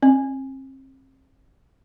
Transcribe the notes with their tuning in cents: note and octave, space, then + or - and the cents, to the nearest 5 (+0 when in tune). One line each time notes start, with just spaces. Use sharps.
C4 +35